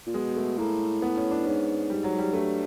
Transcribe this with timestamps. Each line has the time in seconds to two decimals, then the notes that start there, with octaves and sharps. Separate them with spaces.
0.07 A#2
0.14 B2 G#3
0.37 A3
0.58 A2 A#3
1.02 B3
1.17 C#4
1.31 D4
1.46 G#2 C#4
1.90 G3
2.04 F#3
2.19 G3
2.33 G2 A3